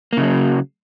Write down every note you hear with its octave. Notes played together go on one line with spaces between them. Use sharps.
C#3 F#3 A#3